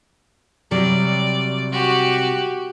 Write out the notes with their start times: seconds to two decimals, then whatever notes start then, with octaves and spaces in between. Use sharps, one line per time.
0.71 C3 F#3 G3 D5
1.72 F#4 G4